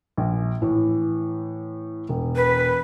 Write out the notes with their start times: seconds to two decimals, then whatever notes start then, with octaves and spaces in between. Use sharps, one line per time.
0.17 A#1
0.62 A2 E3
2.09 E1
2.36 B4